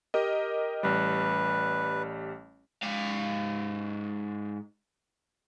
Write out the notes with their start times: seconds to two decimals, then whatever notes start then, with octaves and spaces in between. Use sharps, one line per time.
0.14 G4 A#4 D#5
0.83 A1 G3 B4
2.83 G#2 F5